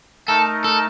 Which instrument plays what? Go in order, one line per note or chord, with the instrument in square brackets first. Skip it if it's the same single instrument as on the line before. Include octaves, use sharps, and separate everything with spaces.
[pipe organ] A3 D#4 A#4 [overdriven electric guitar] A4
[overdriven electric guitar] A4